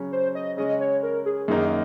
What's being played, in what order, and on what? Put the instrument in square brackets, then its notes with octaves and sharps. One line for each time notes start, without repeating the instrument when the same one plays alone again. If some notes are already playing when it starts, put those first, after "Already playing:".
Already playing: [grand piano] C#3 F#3 C#4
[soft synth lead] C5
D#5
[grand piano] C#3 G#3 C#4 [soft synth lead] D#5
[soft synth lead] C#5
A#4
G#4
[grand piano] F#2 D#3 A#3 D#4 [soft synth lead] G#4